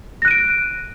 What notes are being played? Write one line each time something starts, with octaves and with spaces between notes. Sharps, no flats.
F#6 A#6 D7 D#7